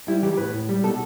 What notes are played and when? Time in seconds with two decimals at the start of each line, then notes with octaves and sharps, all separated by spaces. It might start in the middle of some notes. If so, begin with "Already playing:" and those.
0.08 G3 E4
0.23 E3 G4
0.37 A2 B4
0.54 A2
0.69 G3
0.83 B2 A4